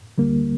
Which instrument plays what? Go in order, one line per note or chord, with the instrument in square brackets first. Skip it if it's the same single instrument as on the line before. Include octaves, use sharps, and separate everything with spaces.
[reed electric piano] D2 D3 G3 A#3